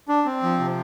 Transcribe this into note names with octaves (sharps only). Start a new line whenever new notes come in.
D4
C4
F3
C3